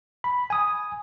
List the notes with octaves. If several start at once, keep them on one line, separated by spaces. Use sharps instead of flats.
B5
G#5 D#6